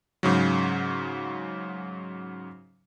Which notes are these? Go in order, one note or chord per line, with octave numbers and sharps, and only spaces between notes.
G#2 C#3 F#3